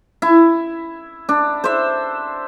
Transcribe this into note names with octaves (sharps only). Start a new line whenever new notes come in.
E4
D4
C5 E5